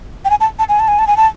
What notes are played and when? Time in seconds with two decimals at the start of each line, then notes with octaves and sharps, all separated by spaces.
0.25 G5
0.30 G#5
0.40 A5
0.59 A5
0.69 G#5
0.80 A5
0.88 G#5
0.99 A5
1.07 G#5
1.17 A5